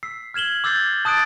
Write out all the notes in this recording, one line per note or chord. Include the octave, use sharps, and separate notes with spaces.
E6 B6 C7
F6 G#6 E7 F#7 G7
D6 E6 G6 A6 C7
A5 D#6 F#6 A6 D7